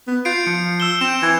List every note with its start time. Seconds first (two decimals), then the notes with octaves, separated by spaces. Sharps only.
0.07 B3
0.25 F4 G6 C7 D7
0.46 F3 C#7
0.80 E6 E7 G7
1.01 C4 E7 G7
1.22 E3